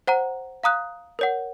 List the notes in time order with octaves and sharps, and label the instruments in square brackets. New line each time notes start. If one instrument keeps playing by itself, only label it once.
[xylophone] C5 F#5 A#5
F5 A#5 D#6 F#6
A#4 C#5 F#5